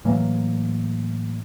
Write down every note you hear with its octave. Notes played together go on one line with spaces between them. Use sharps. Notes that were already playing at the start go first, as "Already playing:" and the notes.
A2 E3 F#3 A#3